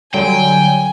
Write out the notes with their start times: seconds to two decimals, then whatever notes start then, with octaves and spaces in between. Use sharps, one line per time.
0.14 D3 F#3 G3 G5 G#5